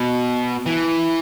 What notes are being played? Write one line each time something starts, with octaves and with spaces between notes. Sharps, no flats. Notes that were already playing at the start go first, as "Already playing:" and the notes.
Already playing: B2
E3